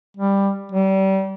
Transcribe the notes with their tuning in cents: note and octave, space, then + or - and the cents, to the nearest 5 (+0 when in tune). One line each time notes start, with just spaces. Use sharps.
G3 +10
G3 -30